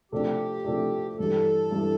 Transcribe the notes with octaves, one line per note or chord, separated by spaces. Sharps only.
C3 F3 A3 D4 G4
C3 F3 A3 D4
G2 E3 G3 A4
G2 E3 G3